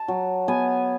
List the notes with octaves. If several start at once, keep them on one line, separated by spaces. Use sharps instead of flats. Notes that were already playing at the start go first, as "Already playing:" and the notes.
Already playing: A5
F#3
B3 G#5